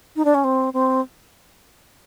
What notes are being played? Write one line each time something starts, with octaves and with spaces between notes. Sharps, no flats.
D#4
D4
C#4
C4
C4